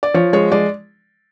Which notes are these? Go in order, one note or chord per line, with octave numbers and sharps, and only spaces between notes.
D5
F3 C#5
G#3 C#5
G#3 D5